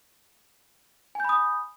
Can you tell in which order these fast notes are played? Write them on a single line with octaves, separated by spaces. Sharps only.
G#5 G6 B5 D#6